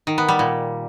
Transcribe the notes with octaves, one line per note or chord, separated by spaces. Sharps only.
D#3
B3
G3
A#2